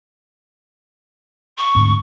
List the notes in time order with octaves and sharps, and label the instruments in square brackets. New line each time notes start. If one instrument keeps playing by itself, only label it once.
[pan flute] C#6
[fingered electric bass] D2 G#2 C4